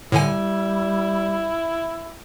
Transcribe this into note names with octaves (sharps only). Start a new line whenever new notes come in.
A2 D3 G3 E4 G#5